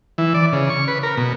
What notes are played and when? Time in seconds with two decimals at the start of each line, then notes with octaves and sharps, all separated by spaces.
0.18 E3
0.34 D5
0.53 C#3
0.70 C#6
0.88 B4
1.03 A#4
1.17 B2